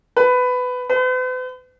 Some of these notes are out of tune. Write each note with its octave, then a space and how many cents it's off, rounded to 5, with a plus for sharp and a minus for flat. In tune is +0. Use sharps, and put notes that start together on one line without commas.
B4 +15
B4 +45